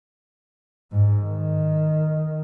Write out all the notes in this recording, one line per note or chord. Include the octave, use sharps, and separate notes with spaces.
G#2
D#3